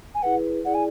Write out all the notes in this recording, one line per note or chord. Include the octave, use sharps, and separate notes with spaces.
G#5
E4 G#4 B4 F#5
E4 G#4 D5 F#5
G#5